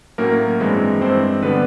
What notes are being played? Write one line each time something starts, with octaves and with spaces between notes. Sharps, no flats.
A2 F#3 A#3 C#4 A#4
G2 E3 G#3 C4
G2 E3 G#3 C4 C5
D3 G3 B3 B4